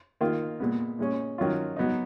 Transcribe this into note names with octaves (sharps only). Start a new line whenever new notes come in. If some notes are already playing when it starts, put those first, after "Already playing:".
D#3 A#3 F4
A#2 G#3 B3
A#2 G#3 C#4
D#3 F#3 C#4 F4
F#3 B3 D#4